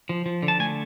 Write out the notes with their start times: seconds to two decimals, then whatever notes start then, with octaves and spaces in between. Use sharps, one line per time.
0.09 F3
0.26 F3
0.43 D3
0.48 A5
0.60 A3 G#5